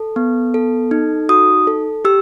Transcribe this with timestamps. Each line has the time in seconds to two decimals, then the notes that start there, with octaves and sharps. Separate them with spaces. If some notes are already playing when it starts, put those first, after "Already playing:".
Already playing: A4
0.16 B3
0.54 A4
0.91 D#4
1.29 F#4 D#6
1.67 A4
2.05 G4 E6